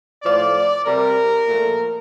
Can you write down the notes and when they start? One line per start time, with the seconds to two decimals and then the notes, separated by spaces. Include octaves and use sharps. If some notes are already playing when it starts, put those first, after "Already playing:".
0.22 A2 F3 A3 D5
0.84 C3 G3 A#4
1.48 A#2 F3 A3